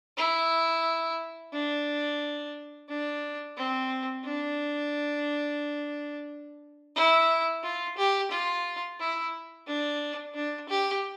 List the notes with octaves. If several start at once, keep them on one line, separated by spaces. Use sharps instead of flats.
E4
D4
D4
C4
D4
E4
F4
G4
F4
E4
D4
D4
G4